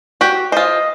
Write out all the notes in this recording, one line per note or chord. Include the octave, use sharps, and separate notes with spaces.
F#4 G4
F4 C5 D#5